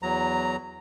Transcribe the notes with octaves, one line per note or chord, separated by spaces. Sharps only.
E2 F#3 A#5